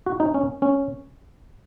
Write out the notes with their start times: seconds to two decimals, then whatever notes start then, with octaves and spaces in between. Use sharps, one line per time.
0.06 F#4
0.20 D#4
0.34 C#4
0.62 C#4